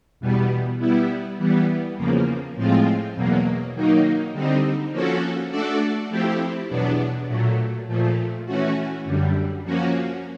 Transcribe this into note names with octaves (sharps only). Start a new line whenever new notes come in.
E2 B2 G3 B3
G3 B3 E4
E3 G3 B3
E2 C#3 F3 A#3
A2 F3 G#3 C4 F4
E2 B2 F#3 A#3
D#3 F#3 A#3 D#4
D3 G3 C4 D#4
F3 A#3 C#4 F#4 A4
A3 D4 F#4 A4 D5
F3 A3 C4 E4 G4
E2 B2 F#3 B3 D4
A#2 F#3 A3
A#2 F3 A3
E3 A3 C#4 F#4
F#2 D3 G3
F3 A#3 C#4 F#4